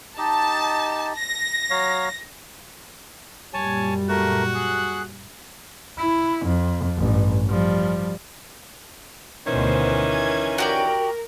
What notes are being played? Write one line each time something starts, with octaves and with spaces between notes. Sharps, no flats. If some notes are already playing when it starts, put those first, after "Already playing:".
D#4 G4 D#5 A5
A#6
F#3 C#5 F5
F#2 A#2 G3 C#5 G#5 A5
A3 F#4 A#4
G#4 F#6
E4
F2
A1 G2
F3 G3
D2 B2 D#3 E3 C#4 C5
G#6
F#4 G4 A#4 D5